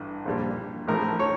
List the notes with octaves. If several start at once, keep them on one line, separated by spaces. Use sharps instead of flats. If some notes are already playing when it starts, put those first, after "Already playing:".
Already playing: A1 G2
A#1 A#2 G3
A#1 A2 F3 A3 A#4
C#5